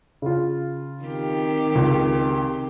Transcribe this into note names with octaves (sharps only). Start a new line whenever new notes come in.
C#3 F4
D#3 C4 G4
C#2